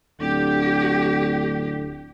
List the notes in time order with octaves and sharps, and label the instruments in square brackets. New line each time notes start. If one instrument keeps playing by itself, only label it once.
[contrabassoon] D1 [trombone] D3 [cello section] G4